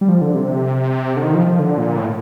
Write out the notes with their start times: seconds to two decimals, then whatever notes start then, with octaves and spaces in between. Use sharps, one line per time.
0.01 G3
0.09 F3
0.21 D3
0.34 C3
1.16 D3
1.22 D#3
1.34 F3
1.47 F3
1.59 D3
1.78 A#2
1.97 A2